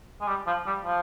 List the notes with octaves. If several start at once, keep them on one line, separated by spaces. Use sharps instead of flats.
G#3
G3
F3
G3
F3